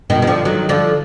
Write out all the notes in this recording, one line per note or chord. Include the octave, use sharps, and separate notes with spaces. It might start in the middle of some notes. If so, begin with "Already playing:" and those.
B2 D#3
D#3
D3 F3
D#3 F#3
D3 F3